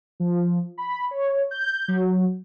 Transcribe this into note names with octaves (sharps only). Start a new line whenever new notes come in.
F3
B5
C#5
G6
F#3